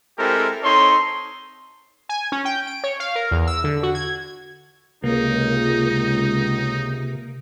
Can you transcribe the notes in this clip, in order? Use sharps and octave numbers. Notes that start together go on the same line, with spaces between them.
G#3 C4 E4 G4 A4 A#4
C4 D#4 A4 C#5 C6
G#5
C#4
G5
D7
C#5
F5
A#4
E2
E6
D3
F#4
G#6
C#2 C3 A#3 D#4